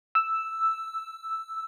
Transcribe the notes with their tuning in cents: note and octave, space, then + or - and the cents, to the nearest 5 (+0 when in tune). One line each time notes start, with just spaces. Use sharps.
E6 +0